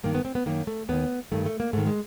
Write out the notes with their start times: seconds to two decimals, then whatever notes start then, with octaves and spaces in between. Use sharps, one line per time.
0.03 G2 D#3 A#3
0.15 B3
0.25 C4
0.35 B3
0.46 F#2 D#3 A#3
0.67 A3
0.89 D#2 D#3 B3
1.32 G2 D#3 A3
1.46 A3
1.60 A#3
1.73 G#2 D#3 A3
1.87 G#3